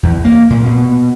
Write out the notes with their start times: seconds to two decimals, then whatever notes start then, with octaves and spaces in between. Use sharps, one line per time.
0.03 E2
0.25 A#3
0.50 A#2
0.66 B2